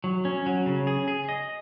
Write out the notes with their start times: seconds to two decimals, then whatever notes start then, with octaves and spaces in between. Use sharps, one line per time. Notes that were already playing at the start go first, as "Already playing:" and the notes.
0.04 F#3
0.25 C#4
0.46 F#3
0.66 C#3
0.87 G#4
1.08 G#4
1.29 D#5